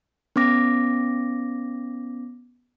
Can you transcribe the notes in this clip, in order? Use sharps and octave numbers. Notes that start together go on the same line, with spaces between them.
B3 C#4 D6 A#6